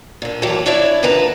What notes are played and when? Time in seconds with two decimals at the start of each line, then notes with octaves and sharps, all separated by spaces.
0.22 A#2 D3
0.42 D#2 E3 F#3 G4 C#5 A5
0.66 D4 E4 C#5 D5 E5
1.03 D#2 D3 F3 B4 A5 A#5